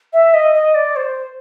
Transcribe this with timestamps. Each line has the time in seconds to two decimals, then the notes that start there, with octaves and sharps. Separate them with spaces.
0.13 E5
0.34 D#5
0.55 D#5
0.75 D5
0.96 C5